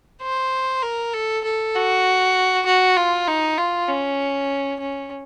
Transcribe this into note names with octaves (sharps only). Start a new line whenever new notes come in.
C5
A#4
A4
A4
F#4
F#4
F4
D#4
F4
C#4
C#4